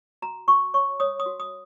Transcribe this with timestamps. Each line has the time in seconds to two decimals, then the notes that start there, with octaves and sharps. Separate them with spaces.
0.22 F#4 A#5
0.48 F#4 C#6
0.74 C#5 C#6
1.00 C#5 D#6
1.20 D#6
1.26 F#4
1.40 D#6